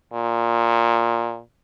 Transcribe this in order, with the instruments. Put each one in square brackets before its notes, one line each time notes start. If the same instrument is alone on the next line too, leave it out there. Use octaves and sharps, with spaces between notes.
[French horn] A#2